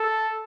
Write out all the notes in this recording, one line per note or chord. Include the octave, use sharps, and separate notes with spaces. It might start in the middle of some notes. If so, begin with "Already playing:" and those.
Already playing: A4